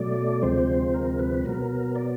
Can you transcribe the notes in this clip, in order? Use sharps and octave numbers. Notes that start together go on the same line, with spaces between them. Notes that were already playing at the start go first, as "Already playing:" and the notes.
Already playing: B2 F#3 A3 D5
D2 C3 F3 G#3 C4 C5
A#4
B4
B2 F#3 B3 A#4
D5